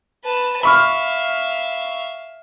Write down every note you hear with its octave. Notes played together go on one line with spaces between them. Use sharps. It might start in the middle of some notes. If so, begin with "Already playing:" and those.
B4 A5
E5 F5 B5 C#6 F6